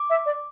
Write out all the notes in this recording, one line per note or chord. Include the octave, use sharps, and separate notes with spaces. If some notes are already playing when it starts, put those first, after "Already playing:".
Already playing: D6
E5
D5